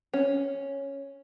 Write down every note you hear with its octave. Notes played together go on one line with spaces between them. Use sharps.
C#4